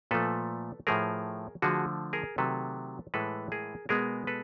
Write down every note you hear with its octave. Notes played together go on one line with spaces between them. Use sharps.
A#2 F3 A3 A4 B4
A2 F3 A3 G#4 A#4
D3 F3 A3 F#4 G#4
G#4 A#4
C3 D#3 F#3 A3 A4 B4
A2 E3 G#3 A4 B4
G#4 A#4
B2 G#3 B3 G#4 A#4
A4 B4